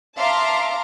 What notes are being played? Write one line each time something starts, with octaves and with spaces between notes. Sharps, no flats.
E5 F5 A5 A#5 C6 D6